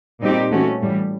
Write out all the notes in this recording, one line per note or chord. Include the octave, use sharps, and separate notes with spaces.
A#2 G3 C4 D#4 G4
E3 A3 C#4 F#4
A2 E3 G3